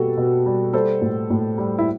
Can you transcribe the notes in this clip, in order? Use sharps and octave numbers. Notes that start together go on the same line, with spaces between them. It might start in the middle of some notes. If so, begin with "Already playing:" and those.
Already playing: B2 G3 F#4 G4 A4
B2
G3
G3 A4 C5
A2
A2
G3
E4